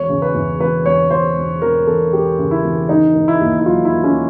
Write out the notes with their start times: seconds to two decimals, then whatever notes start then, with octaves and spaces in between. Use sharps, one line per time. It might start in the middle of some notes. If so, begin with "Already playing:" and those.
Already playing: E1 C#5
0.09 C#3
0.22 B4
0.34 E2
0.60 E1 B4
0.86 E1 C#5
1.11 E1 C5
1.37 E1
1.62 E1 A#4
1.87 E1 A4
2.13 E1 G4
2.39 C#3
2.51 E4
2.64 E1
2.89 D#3 D#4
3.15 D#3
3.28 E4
3.41 D#2
3.59 E4
3.66 F#3 F4
3.85 E4
3.91 D#3
4.04 C#4